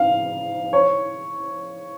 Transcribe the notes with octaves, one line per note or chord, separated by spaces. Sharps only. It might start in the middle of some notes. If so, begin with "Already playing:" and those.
Already playing: F5
C#5